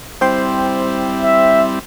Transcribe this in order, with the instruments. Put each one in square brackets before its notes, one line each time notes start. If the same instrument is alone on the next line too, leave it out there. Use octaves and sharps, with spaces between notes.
[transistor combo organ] G3 C4 E4 [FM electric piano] C5 G5 C6
[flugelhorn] E5